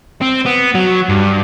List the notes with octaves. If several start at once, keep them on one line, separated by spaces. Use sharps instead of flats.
C4
B3
F#3
G2